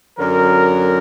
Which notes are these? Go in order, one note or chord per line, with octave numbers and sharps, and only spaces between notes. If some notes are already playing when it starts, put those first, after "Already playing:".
F#2 D3 F#3 A#4